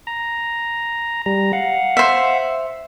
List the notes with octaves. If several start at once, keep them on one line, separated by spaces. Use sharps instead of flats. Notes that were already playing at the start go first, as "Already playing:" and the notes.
A#5
G3 A#5
F5 F#5
C5 E5